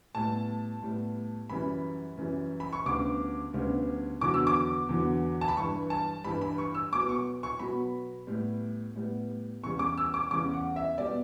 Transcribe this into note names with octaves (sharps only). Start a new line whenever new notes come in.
A2 G3 B3 A5
A2 G3 B3
F#2 E3 G3 B5
F#2 E3 G3
B5
C#6
D2 C#3 G3 B3 D6
D2 C#3 G3 B3
E2 D3 F#3 B3 D6
E6
D6
E2 D3 F#3 B3
A5
B5
G2 E3 G3 C#6
A5
G2 E3 G3 B5
B5
C#6
E6
B2 F#3 B3 D6
C#6
C#6
B2 F#3 B3 B5
A2 G3 B3
A2 G3 B3
E2 C#3 G3 C#6
D6
E6
D6
E2 C#3 G3 D6
F#5
E5
B2 G3 B3 D5